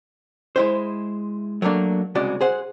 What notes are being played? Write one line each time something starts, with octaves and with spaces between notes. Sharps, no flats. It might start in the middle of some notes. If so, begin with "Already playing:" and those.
G#3 E4 C5
F#3 A3 A#3 D4
C2 C#3 G#3 F#4 D5
G#4 C5 F#5